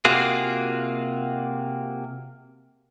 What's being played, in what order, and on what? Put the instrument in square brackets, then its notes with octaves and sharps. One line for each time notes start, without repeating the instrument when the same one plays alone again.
[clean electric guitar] C3 A#3 F4 F#4 G#4